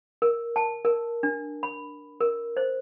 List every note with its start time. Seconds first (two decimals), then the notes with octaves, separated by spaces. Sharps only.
0.22 A#4
0.56 A5
0.85 A#4
1.23 D4
1.63 B5
2.21 A#4
2.57 C5